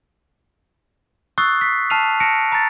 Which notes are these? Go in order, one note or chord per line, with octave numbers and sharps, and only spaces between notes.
C#6 D#6 E6 F#6 A6 C7
B6 C7
A5 F6 C7 D#7 F7
A5 A#6 C#7 D7
A#5 A6